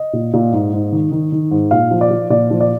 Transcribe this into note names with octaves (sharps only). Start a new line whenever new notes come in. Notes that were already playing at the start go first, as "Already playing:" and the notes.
Already playing: D#5
A#2
A#2
G#2
G#2
D#3
D#3
D#3
G#2
A#2 F5
F3
D5
F3
A#2 D5
F3
D5